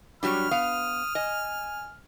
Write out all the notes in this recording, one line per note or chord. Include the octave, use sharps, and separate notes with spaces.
F#3 G3 D4 B5 F6
B3 F5 D#6
D#5 G#5